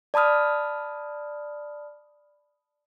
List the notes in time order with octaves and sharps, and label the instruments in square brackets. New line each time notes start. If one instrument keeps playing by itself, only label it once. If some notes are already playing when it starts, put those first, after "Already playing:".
[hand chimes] D5 A5 B5 D#6 F6